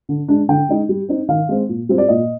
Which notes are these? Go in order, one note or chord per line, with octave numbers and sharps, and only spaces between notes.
D3
G#3 D4
D3 G5
G#3 D#4
G3
C4 D#4
D#3 F5
G#3 C4
A#2
G3 C4 F4
D5
A#2 D#5